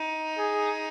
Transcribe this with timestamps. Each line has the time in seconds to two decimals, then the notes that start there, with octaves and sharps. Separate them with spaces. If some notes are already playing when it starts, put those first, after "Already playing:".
Already playing: D#4
0.38 G#4